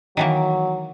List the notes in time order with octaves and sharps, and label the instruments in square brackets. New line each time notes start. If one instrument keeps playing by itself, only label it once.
[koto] D#3 E3 A#3 [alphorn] F#3